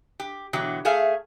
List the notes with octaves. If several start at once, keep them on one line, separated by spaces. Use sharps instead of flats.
G4
B2 D3 E3 F#3 G4
A3 G#4 E5 F5